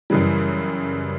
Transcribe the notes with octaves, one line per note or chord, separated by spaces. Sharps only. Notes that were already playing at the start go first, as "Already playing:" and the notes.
F#2 C#3 E3 G3